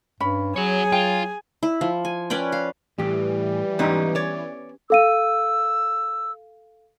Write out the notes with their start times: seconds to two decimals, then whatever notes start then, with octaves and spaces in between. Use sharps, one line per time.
0.20 G2 C#4 B5
0.56 F#3 F#4 G#4 C#5 G#5
0.92 F4 G5
1.63 E4
1.81 F3
2.05 G#5
2.30 C#4 B4 D5 G5
2.52 F5
2.98 A2 E3 G3 G4
3.79 G#2 B3 C#4 D#4 G4
4.15 C#5 D5
4.90 A4 F5 E6 D#7